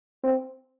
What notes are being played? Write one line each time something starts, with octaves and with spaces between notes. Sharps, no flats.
C4